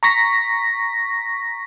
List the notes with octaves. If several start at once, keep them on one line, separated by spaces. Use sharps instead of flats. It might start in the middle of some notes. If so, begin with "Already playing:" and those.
A#5 C#6 A#6 B6